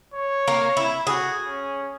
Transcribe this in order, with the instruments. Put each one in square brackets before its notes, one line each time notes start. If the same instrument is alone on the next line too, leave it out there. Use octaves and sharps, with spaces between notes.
[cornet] C#5
[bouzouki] A#3
E4
[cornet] F#4 [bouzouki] G#4
[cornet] C#4